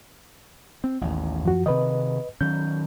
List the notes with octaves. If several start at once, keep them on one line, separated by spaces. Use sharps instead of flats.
C4
A1 D#2
F#2 F3 F#4
C3 D#3 B4 D#5
D#3 F#3 C#4 G6